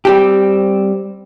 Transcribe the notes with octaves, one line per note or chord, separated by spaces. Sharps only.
G3 C4 G4